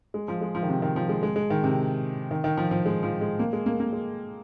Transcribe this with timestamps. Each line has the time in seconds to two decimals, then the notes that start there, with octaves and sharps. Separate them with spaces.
0.14 G#3
0.28 F3
0.41 G#3
0.55 F3
0.63 D#3
0.69 C3
0.82 D#3
0.96 F3
1.09 G#3
1.23 G#3
1.36 G#3
1.50 D#3
1.63 C3
2.31 D#3
2.44 D#3
2.58 F3
2.71 F3
2.86 G#3
3.03 F3
3.21 G#3
3.39 A#3
3.53 G#3
3.66 A#3
3.80 A#3
3.93 G#3